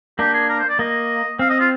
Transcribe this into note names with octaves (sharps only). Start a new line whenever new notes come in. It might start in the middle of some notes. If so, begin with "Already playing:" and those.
A#3 D4 G4
G#4
A#4
C5
D5
A#3 D#5
C4 F5
D#5
F4